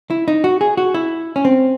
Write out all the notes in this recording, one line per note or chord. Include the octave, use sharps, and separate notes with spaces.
E4
D#4
F#4
G#4
F#4
E4
C#4
C4